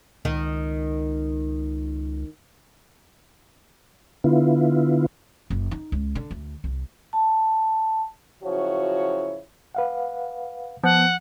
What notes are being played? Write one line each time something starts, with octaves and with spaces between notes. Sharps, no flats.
C#2 D#3
D3 B3 E4 F4
F#1
D#4
C#2
D3
D2
C2
A5
C#3 F3 F#3 E4 F#4 C#5
B4 F5 F#5
F3 B3 F#5